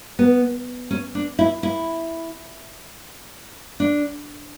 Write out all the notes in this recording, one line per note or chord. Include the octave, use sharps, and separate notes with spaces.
B3
C#4
D4
E4
E4
D4